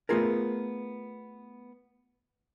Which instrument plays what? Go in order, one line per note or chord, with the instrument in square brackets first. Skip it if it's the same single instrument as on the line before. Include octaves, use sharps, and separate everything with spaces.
[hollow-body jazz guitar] A3 B3 C#4 F4 G#4 A#4